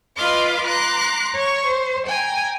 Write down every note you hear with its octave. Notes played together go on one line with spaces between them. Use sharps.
F4 B4 D#5 F5 C6 D6
A#5 C6 D6 F#6
C#5 C#6
C5
G5 G#5 A#5